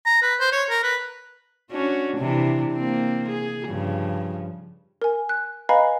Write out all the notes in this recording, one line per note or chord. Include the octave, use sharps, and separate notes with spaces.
A#5
B4
C5
C#5
A#4
B4
C#4 D4 F#4
C3 E3 D4
A#3 C4
G#4
G2 C#3 F3
A#4 G#5
F#6
B4 D#5 F5 G#5 A#5 B5